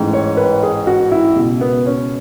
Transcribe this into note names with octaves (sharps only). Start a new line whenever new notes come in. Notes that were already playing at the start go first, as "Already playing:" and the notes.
Already playing: A1 G#2 E3
C#5
B4
G#4
F#4
E4
C#2 B2
B3
C#4